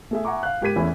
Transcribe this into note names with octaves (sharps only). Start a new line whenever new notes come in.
A3 G#4 E5
E5 F#5 G#5 A#5 C#6 D6
F5 F#6
G#2 G4 A#4 G#6 B6 D#7
E2 E3 A3 C#4 E4